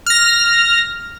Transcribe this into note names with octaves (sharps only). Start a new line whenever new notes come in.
F6 A#6